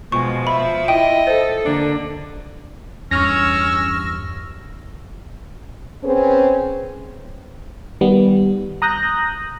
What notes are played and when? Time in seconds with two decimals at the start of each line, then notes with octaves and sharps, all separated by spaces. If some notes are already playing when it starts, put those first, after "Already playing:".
0.12 B2 F3 G#3 C#6
0.47 E5 B5
0.88 E4 F4 D#5 G5
1.27 A4 C5
1.65 D3 A#3 D4
3.11 E2 G2 C#4 C#6 E6 F6 A#6
6.04 C4 C#4 G#4 B4 C5
8.01 D#3 G3 B3
8.82 A#5 D#6 F#6 G6 A#6